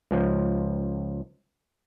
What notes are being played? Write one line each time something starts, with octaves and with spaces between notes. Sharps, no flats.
C#2 F3